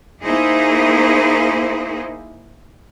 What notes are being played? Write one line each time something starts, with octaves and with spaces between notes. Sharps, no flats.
A#3 D#4 E4 G#4 C5